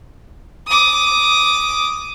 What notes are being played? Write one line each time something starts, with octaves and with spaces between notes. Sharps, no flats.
D6 D#6